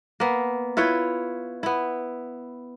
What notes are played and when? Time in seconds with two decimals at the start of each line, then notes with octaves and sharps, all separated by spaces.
0.20 A#3 B3
0.77 E4 F4 B4 C#5
1.63 B3 E4